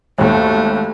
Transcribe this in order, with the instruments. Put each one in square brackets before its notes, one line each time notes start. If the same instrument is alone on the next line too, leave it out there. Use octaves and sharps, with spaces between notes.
[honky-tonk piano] G#1 D#2 [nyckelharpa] A3